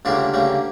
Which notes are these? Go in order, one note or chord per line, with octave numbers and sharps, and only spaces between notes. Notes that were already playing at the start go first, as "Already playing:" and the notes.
D2 C#3 G3 A#3 D4 F4
D2 C#3 G3 A#3